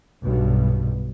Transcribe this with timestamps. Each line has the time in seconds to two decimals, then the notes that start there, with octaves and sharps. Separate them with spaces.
0.24 B1 G2 B2